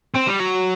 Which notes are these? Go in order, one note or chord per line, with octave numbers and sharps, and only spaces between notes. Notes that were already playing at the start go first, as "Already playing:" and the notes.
C4
G3
F#3